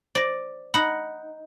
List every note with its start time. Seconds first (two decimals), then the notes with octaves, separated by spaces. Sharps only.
0.15 C5 D5 A#6
0.74 D#4 F#5 B5